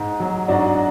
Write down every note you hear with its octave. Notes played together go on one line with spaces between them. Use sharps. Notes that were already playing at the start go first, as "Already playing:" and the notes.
Already playing: G#2
F#3
G#2 D4 F#4